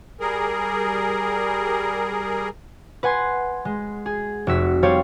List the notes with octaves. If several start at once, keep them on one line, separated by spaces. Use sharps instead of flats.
G3 G#4 A#4
B4 F#5 G#5 C6
G#3
G#4
F1 F#4 E6 B6
G3 G4 A4 C5 C#5 F5